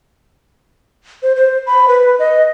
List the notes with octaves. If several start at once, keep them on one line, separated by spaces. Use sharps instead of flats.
C5
C5
B5
B4
D#5